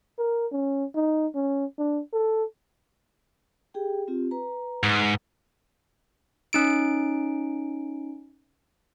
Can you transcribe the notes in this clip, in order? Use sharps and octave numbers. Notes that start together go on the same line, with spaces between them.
A#4
C#4
D#4
C#4
D4
A4
G4 G#4 G5
C4 F4 G4
B4 A#5
G#2
C#4 D#4 D7